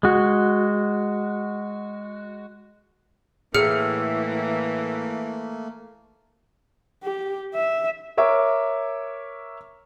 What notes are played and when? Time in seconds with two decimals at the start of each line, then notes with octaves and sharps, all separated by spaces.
0.03 G#3 F#4
3.54 A2 E3 A3 A#3 G#4 F6 C#7
7.04 G4
7.55 E5
8.17 A#4 C#5 E5 D6